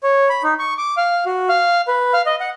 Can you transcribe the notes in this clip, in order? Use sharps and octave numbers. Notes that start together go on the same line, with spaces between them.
C#5
B5
D#4
C#6
D6
F5
F#4
F5
B4
F5
D#5
F#5